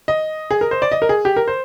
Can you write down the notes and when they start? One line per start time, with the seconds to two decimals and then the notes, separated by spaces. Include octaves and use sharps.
0.08 D#5
0.51 G#4
0.61 A#4
0.71 C5
0.82 D5
0.92 D#5
1.02 A#4
1.09 G#4
1.25 G4
1.36 A#4
1.48 C5